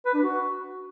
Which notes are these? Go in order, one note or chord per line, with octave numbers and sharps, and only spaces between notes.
B4
D4
F#4